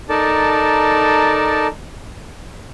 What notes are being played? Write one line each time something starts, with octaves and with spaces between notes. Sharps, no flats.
D#4 A4 A#4 D5 A5